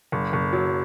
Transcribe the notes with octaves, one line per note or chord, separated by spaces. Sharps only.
F#1
F#1
F#3